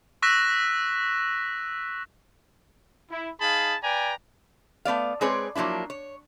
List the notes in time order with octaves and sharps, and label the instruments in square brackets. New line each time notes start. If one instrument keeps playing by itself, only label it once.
[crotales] C#6 E6 F#6 A#6 B6 E7
[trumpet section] E4
D#4 G#4 F5 A5 B5
B4 D5 G5 G#5 A#5
[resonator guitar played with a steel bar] A3 B3 D5 F5
G#3 C4 G#4 B4 C#5 D5
F3 F#3 A#3 D4 E4
C#5